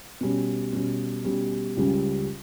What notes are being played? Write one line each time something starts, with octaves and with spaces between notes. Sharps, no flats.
B2 G3 C#4
B2 G3 C#4
B2 G3 C#4
C#2 C#3 G3 C#4